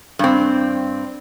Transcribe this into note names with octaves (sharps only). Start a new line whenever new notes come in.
G2 C4